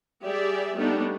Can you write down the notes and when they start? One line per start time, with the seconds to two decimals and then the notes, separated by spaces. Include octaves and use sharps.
0.24 G3 G4 G#4 D5 E5
0.75 G3 A3 B3 D4 D#4